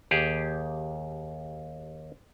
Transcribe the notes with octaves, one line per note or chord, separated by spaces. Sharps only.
D#2 G4 G#4